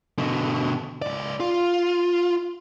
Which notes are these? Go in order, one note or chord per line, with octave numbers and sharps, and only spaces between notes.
B2 D3
C#2 D5
F4